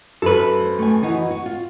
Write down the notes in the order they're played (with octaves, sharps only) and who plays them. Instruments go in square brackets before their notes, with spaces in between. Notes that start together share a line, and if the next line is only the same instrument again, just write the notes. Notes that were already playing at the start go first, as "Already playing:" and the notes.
[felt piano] F#2 [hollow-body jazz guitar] A4 B4
[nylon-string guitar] C5
A3 G#5
E3 D#4 F#4
F#4
F4